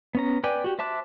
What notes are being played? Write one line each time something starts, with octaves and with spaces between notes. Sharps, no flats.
B3 C#4 A#5
B4 D5 G5 G#5
F#4 G4
C5 E5 A5 D6 F#6